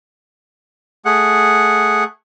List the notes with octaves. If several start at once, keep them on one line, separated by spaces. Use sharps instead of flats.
A3 G#4 F#5